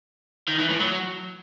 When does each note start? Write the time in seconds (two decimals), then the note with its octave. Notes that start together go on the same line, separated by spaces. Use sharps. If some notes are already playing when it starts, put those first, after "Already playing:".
0.48 D#3
0.59 E3
0.70 A2
0.81 F#3